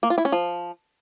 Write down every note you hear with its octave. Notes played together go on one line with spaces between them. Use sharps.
A#3
F4
E4
C#4
F3